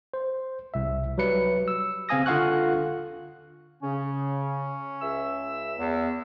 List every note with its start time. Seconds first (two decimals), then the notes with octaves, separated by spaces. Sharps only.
0.14 C5
0.74 C2 E5
1.18 F#3 G3 B4 C#7
1.68 E6
2.09 C#3 C4 F5 G#5 D#6 A#6
2.26 D3 F4 F5 F#5 C#6 F#6
3.83 C#3 C#4
5.01 C#2 E5 E6
5.79 E2